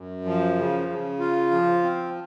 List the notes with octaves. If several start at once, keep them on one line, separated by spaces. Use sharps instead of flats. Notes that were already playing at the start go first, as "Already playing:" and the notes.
Already playing: F#2
F3
C#3
C#3
F4
F3
C4